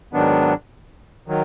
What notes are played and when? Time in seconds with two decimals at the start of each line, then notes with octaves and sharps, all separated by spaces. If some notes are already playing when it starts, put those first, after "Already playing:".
0.13 G#2 D#3 F#3 B3 D4
1.28 D#3 F#3